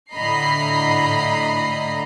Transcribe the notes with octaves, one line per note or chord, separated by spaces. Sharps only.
A2 D3 D#5 A#5 B5 C7